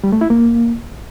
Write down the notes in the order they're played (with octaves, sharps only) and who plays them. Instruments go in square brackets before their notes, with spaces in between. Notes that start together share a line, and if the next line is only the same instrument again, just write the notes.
[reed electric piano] G3
A3
E4
A#3